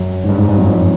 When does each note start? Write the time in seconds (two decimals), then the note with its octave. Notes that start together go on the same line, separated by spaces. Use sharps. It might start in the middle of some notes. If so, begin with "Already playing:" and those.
Already playing: F#2
0.24 G#2
0.29 G2
0.38 G#2
0.48 G2
0.58 F#2
0.66 F2